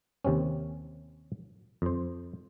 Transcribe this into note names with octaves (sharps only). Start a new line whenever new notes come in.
D#2 C3 C4 C#4
F2 C5